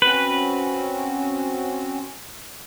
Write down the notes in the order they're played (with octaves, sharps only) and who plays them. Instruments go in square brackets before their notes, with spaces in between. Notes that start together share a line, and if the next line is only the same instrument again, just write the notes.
[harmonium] C4 C#4 F#4 [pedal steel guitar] B4